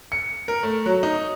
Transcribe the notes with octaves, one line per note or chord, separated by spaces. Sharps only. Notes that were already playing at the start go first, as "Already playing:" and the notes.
C#7
A#4
A3
F#3
D#4